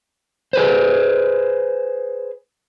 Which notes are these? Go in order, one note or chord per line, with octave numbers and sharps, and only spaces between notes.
G#4 B4 C5